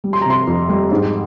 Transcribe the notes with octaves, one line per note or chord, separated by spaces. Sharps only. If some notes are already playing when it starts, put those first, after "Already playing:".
G3
C6
A#5
C3 C6
F2
G3
G#2